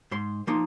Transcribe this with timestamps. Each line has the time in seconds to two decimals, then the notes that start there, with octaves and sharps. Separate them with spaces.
0.11 G#2 C6
0.47 F3 A#3 D#4 C6